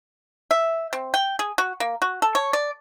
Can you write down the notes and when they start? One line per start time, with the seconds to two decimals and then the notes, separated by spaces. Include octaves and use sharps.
0.51 E5
0.93 C4
1.14 G5
1.39 G#4
1.58 F#4
1.80 A#3
2.02 F#4
2.22 A4
2.35 C#5
2.53 D5